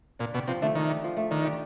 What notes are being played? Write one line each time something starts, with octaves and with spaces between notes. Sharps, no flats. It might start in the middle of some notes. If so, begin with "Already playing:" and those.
A#2 D4
B2 G4
C3 F3
D3 A3
D#3 D4
G4
F3
A3
D#3 D4
G4